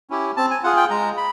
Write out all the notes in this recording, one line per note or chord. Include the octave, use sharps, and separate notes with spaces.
C#4 E4 G4
C4 A5
G#5
F4 G#4 F#5
G5
G#3 A#5
B5